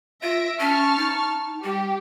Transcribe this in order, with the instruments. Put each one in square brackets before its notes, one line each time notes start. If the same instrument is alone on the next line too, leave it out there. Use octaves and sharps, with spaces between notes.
[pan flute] F4 [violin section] E5 A#6 D7
[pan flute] C#4 [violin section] A5 C#6 F6
[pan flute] D#4
[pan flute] G3 [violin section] G4